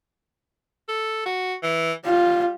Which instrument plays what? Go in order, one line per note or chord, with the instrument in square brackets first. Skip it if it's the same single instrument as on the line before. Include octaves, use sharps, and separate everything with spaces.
[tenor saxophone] A4
F#4
E3
[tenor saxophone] G3 [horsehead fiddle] F4